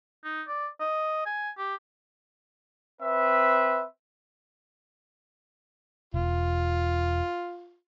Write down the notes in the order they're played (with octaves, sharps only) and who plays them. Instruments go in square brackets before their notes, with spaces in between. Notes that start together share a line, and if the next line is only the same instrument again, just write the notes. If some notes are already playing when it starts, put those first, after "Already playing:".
[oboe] D#4
D5
D#5
G#5
G4
[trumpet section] C4 B4 E5
[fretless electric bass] E1 [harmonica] F4